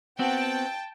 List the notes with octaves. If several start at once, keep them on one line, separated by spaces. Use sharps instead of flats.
B3 C4 F#4 G5 A5